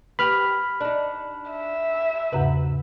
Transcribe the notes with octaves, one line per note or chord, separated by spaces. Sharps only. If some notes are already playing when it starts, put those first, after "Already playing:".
G4 B4 B5 F6
D4 D#4
E5
E2 G#2 C#3 B4